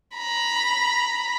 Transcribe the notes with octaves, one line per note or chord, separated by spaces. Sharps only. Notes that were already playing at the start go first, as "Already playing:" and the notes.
A#5 B5